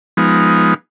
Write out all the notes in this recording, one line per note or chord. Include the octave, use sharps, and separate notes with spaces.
F3 G#3 B3 D#4